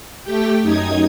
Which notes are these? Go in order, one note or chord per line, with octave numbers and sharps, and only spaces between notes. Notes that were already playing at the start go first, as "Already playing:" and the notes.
A3 G4 G5
F#2 D#4 D#6 G#6